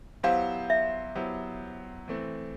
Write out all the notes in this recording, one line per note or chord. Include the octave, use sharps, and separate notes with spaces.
F#3 B3 E4 G4 C5 F5
E5
F#3 B3 E4 G4 C5
E3 A3 C4